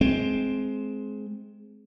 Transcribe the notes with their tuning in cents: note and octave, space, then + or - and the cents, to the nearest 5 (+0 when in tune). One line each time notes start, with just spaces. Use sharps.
G#3 +20 C4 +0